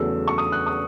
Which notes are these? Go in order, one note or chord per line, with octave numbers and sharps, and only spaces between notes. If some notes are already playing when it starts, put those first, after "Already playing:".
Already playing: E2 C#3 F#3 A3 E6
C#6
D#6
F#6
D#6